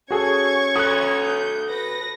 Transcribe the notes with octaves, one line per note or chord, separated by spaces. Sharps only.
C#4 F#4 G#4 A4 C#6 G#6
F#4 A4 D#6 F#6
G6
B4 A#6